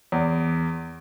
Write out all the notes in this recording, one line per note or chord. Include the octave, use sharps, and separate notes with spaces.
E2